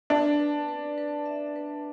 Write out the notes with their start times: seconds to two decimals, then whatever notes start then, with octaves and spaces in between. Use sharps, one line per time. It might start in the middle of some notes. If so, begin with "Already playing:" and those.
0.10 D4 B4
0.39 B4
0.68 B4
0.98 B4
1.26 E5
1.56 B4